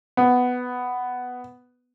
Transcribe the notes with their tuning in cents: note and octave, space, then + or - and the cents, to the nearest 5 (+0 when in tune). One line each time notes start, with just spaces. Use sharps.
B3 +10